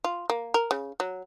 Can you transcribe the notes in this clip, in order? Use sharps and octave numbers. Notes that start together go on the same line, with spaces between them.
F4
A#3
A#4
C#3
F#3